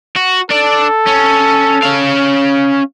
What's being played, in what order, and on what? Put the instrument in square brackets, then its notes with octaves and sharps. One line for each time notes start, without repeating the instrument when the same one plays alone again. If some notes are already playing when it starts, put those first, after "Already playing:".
[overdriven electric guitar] F#4
[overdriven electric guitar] D4 D5 [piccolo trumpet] A4
[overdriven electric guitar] C#4
C#4 F5